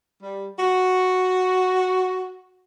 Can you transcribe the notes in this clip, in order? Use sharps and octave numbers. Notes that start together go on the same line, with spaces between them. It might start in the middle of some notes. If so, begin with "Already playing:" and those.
G3
F#4